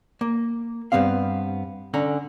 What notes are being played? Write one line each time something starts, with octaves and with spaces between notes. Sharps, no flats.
A#3
G2 C3 B3 C4 F5
D3 C#4 A#5